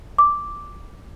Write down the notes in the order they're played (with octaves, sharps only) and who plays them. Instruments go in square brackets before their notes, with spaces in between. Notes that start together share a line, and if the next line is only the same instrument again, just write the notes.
[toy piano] D6